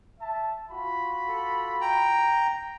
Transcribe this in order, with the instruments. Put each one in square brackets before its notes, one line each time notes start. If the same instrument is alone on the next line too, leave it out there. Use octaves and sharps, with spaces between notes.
[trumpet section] E5 A5
F4 F#4 B5
[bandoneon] A4
G5 A#5